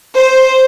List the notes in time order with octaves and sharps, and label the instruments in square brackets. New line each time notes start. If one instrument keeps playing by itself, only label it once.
[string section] C5